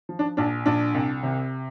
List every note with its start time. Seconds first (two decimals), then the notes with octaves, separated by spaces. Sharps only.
0.09 F3
0.19 D4
0.37 A#1 D4
0.66 A#1 D4
0.94 C2
1.23 C3